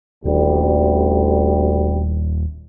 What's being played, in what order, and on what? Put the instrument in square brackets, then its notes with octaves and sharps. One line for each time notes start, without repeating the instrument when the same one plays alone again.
[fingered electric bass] D#1 [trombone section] A1 D2 G3